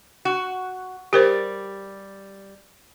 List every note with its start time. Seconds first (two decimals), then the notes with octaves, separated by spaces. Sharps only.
0.25 F#4
1.13 G3 G4 A#4 C5 D5